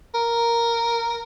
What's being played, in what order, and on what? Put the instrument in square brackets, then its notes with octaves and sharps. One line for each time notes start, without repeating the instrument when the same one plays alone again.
[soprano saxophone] A#4